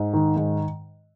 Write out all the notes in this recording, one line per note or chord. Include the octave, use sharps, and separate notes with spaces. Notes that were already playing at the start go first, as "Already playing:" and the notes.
Already playing: G#2
D#3
G#2